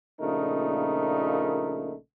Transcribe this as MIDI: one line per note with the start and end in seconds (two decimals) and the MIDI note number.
0.21 1.95 34
0.21 1.95 46
0.21 1.95 49
0.21 1.95 57
0.21 1.95 63
0.21 1.95 70